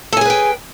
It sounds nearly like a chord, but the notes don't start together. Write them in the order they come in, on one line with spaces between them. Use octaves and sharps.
A4 G#5 G#4 B4 G5